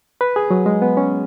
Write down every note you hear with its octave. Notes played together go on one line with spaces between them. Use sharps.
B4
G#4
F#3
G#3
B3
C#4